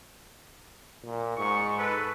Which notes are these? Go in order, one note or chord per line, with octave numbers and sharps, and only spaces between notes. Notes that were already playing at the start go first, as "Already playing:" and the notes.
A#2
G#2 C#6
A4 B4